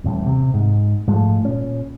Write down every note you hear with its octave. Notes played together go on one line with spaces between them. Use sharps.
D#1 A1 A2
C3
G#2
G#2 F3 G#3 A3
A#2 C#4